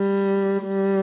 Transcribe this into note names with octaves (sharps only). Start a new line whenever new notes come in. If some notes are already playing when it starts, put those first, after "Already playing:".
Already playing: G3
G3